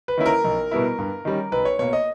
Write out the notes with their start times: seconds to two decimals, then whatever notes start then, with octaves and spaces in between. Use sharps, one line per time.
0.08 B4
0.18 D#3 A#3 C#4 E4
0.26 A#4
0.44 B1
0.71 B2 G3 B3 E4
0.98 G2
1.25 D#3 G3 C#4
1.52 B1 B4
1.65 C#5
1.79 B2 A#3 C#5
1.93 D#5